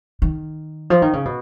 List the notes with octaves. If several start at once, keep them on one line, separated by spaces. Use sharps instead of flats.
D#3
F3
D#3
C#3
B2